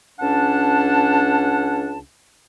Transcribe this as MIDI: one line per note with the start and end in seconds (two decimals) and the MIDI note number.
0.19 1.98 37
0.19 1.98 61
0.19 1.98 62
0.19 1.98 78
0.19 1.98 81